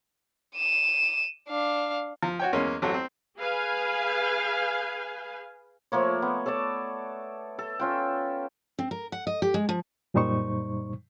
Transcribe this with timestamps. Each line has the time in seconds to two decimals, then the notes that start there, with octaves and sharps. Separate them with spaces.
0.56 D#7 E7
1.48 D4 F5
2.22 F3
2.39 F#4 C#5 G5
2.53 E2 G#3 A#3 C#4 C6
2.82 A1 F#3 C4 A4
2.94 C4
3.37 G#4 B4 F5 G#5
5.92 F3 A3 A#3 C#5
6.22 B3
6.46 A4 C#5 D5 A5
7.59 A4
7.79 C#4 F4 G5
8.79 C4
8.91 A#4
9.12 F#5
9.27 D#5
9.42 G4
9.54 G#3
9.69 F3
10.14 F#2 A#2 G3 D#4 C5 C#6